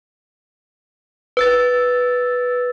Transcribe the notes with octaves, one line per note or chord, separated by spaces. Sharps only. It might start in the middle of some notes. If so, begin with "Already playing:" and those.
B4 E6 A6